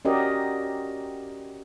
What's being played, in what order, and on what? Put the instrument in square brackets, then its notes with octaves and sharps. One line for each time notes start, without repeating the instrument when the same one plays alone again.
[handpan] C#4 F#4 G4 A#4 D5 D#5